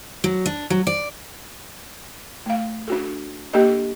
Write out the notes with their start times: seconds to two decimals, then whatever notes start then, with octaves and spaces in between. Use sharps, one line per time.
0.24 F#3
0.46 D4
0.70 F#3
0.87 D5
2.46 A3 F5
2.88 D4 F#4 A4
3.53 A#3 D4 G4 A4 D#5